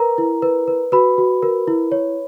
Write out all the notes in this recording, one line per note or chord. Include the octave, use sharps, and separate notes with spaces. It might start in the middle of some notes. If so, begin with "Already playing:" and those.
Already playing: A#4 B4 A#5
E4
B4
B4
F#4 B4 B5
F#4
A#4
E4
C#5